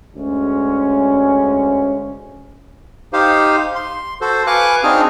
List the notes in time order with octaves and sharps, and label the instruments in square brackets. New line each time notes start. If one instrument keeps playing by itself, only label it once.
[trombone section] D2 G#3 C#4
[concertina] D#4 G4 C5 F5
C6
F#4 A4 C5
B4 F5 G#5 C#6 D6 F#6
C4 D4 D#4 F#4 G#4 F6